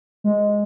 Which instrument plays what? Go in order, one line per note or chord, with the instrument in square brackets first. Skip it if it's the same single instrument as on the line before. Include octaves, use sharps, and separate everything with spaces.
[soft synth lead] G#3